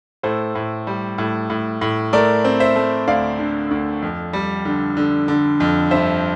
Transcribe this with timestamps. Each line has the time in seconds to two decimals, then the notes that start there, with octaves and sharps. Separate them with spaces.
0.23 A2 A4 C5
0.55 A2
0.87 G3
1.18 A2
1.50 A2
1.81 A2
2.13 A3 A#4 D5
2.44 C4
2.60 C5 E5
2.76 A3
3.07 D2 D5 F5
3.39 D3
3.71 D2
4.02 F2
4.33 G3
4.65 D3
4.97 D3
5.28 D3
5.60 F2
5.91 G2 C5 E5